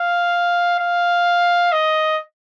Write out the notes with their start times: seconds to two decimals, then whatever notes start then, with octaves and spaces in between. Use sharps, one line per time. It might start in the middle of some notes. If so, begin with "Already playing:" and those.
Already playing: F5
0.79 F5
1.72 D#5